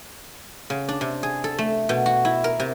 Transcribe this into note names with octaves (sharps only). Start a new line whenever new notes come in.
C#3
D4
C3
G#4
A4
A3
B2
F#4
E4
A#4
C3